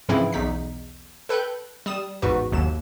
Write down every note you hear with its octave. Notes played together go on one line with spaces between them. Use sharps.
G#2 C#3 E3 F3 C4 E4
B1 E2 D#4 B6
A4 B4 G5 F#6 G6
G3 D#6 E7
A1 E2 G#2 F#4 B4
G1 D#2 F#3 E7